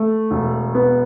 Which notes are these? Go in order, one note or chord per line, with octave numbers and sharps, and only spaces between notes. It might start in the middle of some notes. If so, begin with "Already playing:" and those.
Already playing: A3
E1
B3